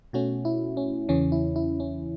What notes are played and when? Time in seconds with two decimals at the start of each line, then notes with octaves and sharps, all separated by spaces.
0.13 B2 A3 C#4 F#4
0.45 E4
0.77 C#4
1.09 E2 C#3 E3 C#4
1.32 E4
1.56 E4
1.80 C#4